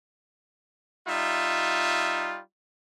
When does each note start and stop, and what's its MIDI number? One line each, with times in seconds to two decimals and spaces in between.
1.08 2.40 55
1.08 2.40 63
1.08 2.40 65
1.08 2.40 76